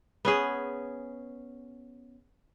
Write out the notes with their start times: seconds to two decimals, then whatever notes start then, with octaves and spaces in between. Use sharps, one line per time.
0.25 B3 C#4 G#4